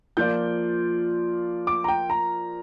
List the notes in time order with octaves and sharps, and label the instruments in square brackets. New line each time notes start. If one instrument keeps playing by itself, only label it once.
[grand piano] F3 A#3 F4 D5 [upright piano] G6
[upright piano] D6
A#5
G5
A#5